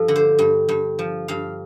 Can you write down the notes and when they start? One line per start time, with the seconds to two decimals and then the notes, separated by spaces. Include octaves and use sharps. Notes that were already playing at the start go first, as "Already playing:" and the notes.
Already playing: G2 F3 A4
0.08 D3
0.16 C5
0.39 G2
0.69 G2
0.99 F3
1.28 G2 F5